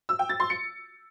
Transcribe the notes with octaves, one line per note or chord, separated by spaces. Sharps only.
E6
G5
A6
C6
C#7